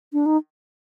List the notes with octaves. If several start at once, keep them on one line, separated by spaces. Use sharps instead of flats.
D4
D#4